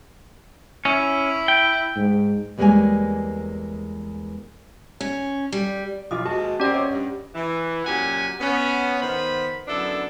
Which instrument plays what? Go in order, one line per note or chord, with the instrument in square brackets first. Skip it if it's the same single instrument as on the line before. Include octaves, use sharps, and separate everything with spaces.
[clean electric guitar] C#4 [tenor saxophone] E4
[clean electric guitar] G5
[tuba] G#2
[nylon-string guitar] E2 G3 G#3 A#3 C#5 G#5
[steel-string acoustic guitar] C#4
G3
[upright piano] B1 F4 D6 [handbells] D#6
[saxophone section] D#2 B2 G#3 [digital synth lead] F#4 [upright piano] A5
[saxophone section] A#3 C4 [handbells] C#4 D5 [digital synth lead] G4 [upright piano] G5 A#6
[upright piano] C#5 D#5 D6
[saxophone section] G2
[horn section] E3
F#2 A#2 F#3 G4 F#5 G#5
B3 C#4
D#3 B3 C5 B5
F#2 D3 B3 D4 E4 A4